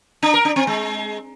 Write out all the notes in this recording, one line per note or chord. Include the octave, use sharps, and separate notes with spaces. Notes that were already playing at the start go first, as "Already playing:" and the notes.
D4
A#4
D4
C4
G#3